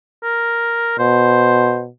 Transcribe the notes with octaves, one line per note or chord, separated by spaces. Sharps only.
A#4
B2 C5